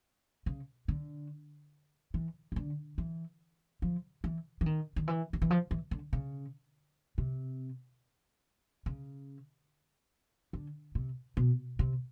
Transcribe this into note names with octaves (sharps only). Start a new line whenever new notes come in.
C#3
D3
E3
C#3
D3
E3
F3
E3
E3
D#3
D#3
E3
D#3
E3
F3
E3
D3
C#3
C3
C#3
D3
C3
B2
C3